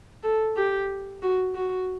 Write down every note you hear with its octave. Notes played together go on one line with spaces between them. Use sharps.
A4
G4
F#4
F#4